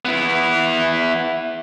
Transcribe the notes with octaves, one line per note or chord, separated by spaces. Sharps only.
B3 E4